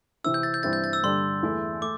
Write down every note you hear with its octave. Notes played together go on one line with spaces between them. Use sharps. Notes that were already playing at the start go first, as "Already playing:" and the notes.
C3 E3 C4 E4 E6
G6
A6
G6
G2 E3 C4 E4 A6
G6
A6
E6
G2 D3 G3 D4 C6
E2 E3 A3 E4
A3 D6